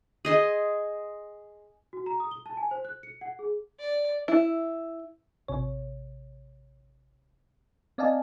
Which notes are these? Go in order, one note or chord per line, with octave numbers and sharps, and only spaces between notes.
G#4 D#5 C6
F#4
A#5
D#6
G7
A5
G#5
C5
F#6
C#7
F#5
G#4
D5
E4
A1 C3 C#5
C4 D5 D#5 F5 G#5 A5